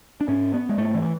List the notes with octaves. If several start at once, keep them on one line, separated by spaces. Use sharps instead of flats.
D4
G#2 C#4
B3
G#3
G#2 A3
E3